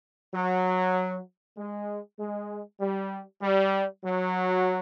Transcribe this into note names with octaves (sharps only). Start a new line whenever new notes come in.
F#3
G#3
G#3
G3
G3
F#3